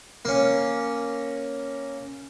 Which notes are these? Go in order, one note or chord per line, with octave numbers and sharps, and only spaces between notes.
A#3 C#4